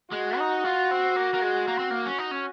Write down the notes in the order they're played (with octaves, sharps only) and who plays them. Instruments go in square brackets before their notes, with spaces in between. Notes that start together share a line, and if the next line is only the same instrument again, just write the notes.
[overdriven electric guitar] G#3 [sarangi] F#4
[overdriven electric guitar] D#4
F4
C4
A#3
A#3
G#3
A#3
C4
A#3
C#4
D#4
C#4